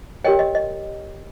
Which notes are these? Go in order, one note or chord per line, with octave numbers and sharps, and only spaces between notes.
G4 A#4 C#5 D#5 G5
D#5
D#5